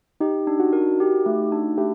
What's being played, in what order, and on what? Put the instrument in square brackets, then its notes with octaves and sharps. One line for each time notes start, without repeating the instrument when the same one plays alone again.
[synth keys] D#4 [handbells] G4
[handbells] D4
[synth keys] F#4
[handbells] A#4
G4
A3
D4
[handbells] A3 [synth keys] G4